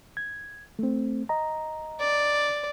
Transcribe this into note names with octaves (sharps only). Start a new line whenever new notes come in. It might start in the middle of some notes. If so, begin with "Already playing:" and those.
G#6
A3 C4
D#5 A#5
D5